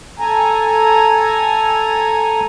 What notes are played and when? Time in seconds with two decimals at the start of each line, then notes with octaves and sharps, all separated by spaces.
0.19 A4 G#5 A#5